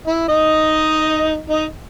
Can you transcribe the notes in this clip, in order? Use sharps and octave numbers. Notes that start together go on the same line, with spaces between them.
E4 E5
D#4 D#5
D#4 D#5